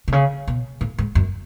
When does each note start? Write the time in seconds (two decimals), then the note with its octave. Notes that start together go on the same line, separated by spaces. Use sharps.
0.08 B2
0.12 C#3
0.48 B2
0.81 A2
0.98 G#2
1.15 F#2